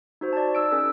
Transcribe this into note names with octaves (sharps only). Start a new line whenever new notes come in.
D#4 F#4 C5
D5 A5
D#4 E6 D7
C#4 G#4 A#4 E6